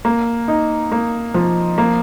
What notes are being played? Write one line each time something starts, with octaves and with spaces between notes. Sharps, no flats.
A#3
D#4
A#3
F3
A#3